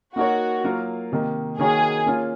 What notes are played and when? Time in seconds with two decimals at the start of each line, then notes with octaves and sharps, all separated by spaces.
0.16 A#3 D#4 F#4 A#4 C#5
0.64 F#3 A#3 F4 A#4
1.12 C3 D#3 A#3 D#4
1.58 D#3 A#3 D#4 F#4 G#4 C#5
2.06 A#3 C#4 F4